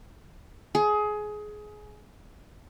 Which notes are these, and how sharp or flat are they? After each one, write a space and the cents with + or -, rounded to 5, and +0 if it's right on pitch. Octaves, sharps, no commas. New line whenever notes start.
G#4 +20